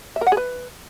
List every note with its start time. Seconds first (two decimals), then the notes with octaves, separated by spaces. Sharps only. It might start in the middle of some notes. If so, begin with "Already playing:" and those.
0.16 E5
0.21 A#4
0.27 F#5
0.32 G#4
0.37 B4